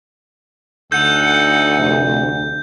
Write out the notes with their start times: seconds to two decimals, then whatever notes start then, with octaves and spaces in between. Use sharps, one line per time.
0.92 D2 D#4 A4 F#5 G6
1.78 F1